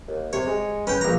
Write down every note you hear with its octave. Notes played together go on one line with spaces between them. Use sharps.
D#2
C3 C#5
G#3
C#4 B4 G5
A#1 A#5